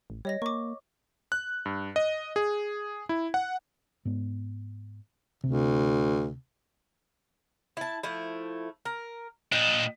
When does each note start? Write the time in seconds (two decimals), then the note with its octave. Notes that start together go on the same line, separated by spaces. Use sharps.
0.10 A1
0.25 G3 C#5 D#5 A#6
0.42 A#3 C#6 D6
1.32 F#6
1.66 G2
1.96 D#5
2.36 G#4
3.09 E4
3.34 F#5
4.05 G#2 B3
5.44 D2 C3 C4
7.77 E4 A5
8.03 F3 A3 E4
8.85 A#4
9.52 A#2 D4 D#5 G5